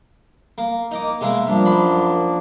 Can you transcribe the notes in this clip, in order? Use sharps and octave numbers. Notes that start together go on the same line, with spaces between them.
A#3
A#3 D#4 D#5 D6
B2 G#3 A#3 E5
G2 F3 A#3 D4
F#2 B5 C6